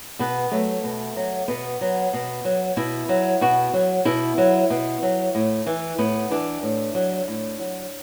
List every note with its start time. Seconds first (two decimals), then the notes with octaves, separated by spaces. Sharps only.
0.19 B2 B3
0.51 F#3 A3
0.84 B2
1.16 F#3
1.48 B2 B3
1.81 F#3
2.13 B2
2.45 F#3
2.77 B2 E4
3.09 F#3
3.41 B2 F#4
3.74 F#3
4.05 B2 E4
4.38 F#3
4.70 B2
5.03 F#3
5.35 A2
5.66 E3
5.98 A2 B3
6.31 E3 D4
6.63 A2
6.95 F#3
7.28 A2
7.59 F#3